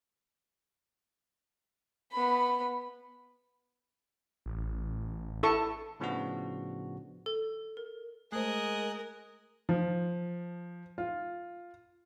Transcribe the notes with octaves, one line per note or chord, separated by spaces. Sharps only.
B3 B5
A1
E4 A4 C#6
A2 C#3 F3 B3 D4 F#4
A4
A#4
G#3 A3 A#4 C5 G#5 D#6 F#6
F3
F4